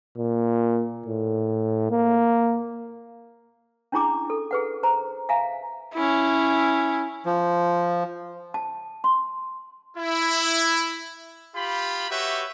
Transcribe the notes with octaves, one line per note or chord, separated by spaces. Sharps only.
A#2
A2
A#3
C#4 D4 E4 G#4 A#5 D6
A4
G#4 B4 F#5
C5 A#5
E5 F5 G#5 A#5
C#4 E4
F3
A5
C6
E4
F4 G4 B5
F#4 G4 B4 C#5 E5